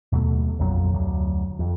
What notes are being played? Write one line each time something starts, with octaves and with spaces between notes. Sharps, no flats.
D#2 B2 F#3 A3
A#1 F2 A#2 F#3
F1 D2 F#3
F2